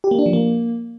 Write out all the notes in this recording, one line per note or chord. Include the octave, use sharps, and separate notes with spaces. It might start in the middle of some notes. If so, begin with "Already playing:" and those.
G4
A#3
D4
F3
A#3